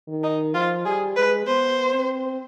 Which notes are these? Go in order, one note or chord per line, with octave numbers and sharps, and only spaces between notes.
D#3
D#4
F3 F4
G3 G#4
G#3 B4
B3 C5
C4